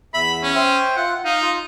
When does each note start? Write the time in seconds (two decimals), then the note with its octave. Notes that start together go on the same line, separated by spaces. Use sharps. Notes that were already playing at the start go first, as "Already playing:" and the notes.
0.14 E2 E5 B5
0.43 C#4
0.55 C5 E5 G5
0.97 F4 F#5
1.25 D#4 F5
1.42 F4